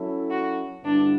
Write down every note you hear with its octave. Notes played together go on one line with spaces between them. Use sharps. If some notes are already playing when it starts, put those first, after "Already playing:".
Already playing: F#3 C#4 E4 A4
F#4
G2 D3 G3 B3 D4 E4